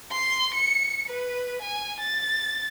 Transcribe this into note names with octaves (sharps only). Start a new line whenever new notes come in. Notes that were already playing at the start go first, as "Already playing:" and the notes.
C6
C#7
B4
G#5
A6